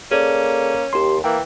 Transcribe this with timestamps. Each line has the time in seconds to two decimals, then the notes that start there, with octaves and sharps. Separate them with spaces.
0.11 A#3 C#4 G#4 A4 D5
0.93 D#2 G4 C6
1.24 E3 A#3 G5